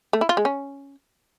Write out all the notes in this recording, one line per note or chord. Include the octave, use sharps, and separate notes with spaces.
A3
E4
F4
G#3
C#4